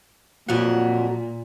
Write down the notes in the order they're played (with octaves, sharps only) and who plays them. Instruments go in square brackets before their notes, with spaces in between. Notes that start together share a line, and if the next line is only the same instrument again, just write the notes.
[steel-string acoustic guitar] F2 F#3 F#5 [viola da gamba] A#2